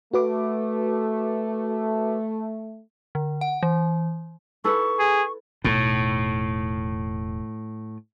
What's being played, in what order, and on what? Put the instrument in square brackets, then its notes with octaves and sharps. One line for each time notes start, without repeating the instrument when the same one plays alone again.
[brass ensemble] A3 [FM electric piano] F#4 B4 D6
[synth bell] D3
F#5
E3
[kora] E4 A4 B4 [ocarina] C#6
[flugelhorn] G#4
[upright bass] E1 D#4 [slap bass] A2